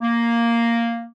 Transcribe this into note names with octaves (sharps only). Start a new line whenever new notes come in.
A#3